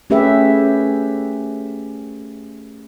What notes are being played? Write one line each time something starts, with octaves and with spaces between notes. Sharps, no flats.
A3 C#4 G4 G#4 B4 E5